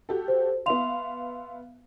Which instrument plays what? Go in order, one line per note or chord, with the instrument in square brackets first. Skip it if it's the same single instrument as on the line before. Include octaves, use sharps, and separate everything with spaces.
[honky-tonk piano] F#4 G4 A4
[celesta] C5
[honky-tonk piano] B3 E5 F5 [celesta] C6 F7